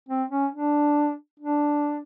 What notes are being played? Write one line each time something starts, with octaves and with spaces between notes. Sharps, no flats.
C4
C#4
D4
D4